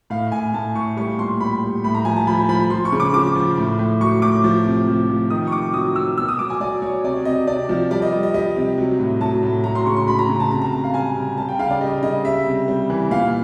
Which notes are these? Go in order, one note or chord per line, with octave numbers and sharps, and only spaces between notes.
A2 F5
A2 G#5
A2 A5
A2 C#6
G3 C#6
A#2 C6
G3 B5
G3
A2 B5
A#5
F3 G#5
A5
F3 B5
F3 B5
F3 C6
C#6
C#3
D6
F3 D6
F3
A2
A2
F#3 C#6
A2 D6
F3
C3
F3
F3
D#3 D#6
C#6
C3 D6
F#3 D#6
F#3 E6
B2 E6
D#6
F#3 D6
G#5
F#3 D5
F#3 C#5
C3 D5
C3 D#5
C3 D5
F3
G3 D5
D#5
G3
D#5
G3 D#5
C3
F#3
A2
F#3 A5
A2
F#3 A#5
C6
C#3 C#6
C6
F#3 B5
A#5
C#3
A5
C3 A#5
A#5
C3 A5
F5
G3 G#5
C3
G3 A5
G5
C#3 F5
D5
G3 D#5
C#3 D#5
G3 E5
C3
G3
E3
A#2 F5